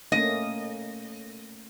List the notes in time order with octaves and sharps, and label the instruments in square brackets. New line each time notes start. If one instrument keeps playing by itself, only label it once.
[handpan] A3 A#3 C#4 [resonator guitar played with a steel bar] D#5